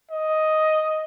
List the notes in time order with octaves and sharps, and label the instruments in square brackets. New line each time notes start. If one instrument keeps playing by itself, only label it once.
[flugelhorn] D#5